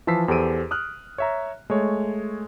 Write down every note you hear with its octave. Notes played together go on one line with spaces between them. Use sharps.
E3 F3 A5 E6 B6 C7
E2 G4 A4 C5 D7 D#7
D#6 F6 F#6
C#5 E5 A#5
G#3 A3 C#5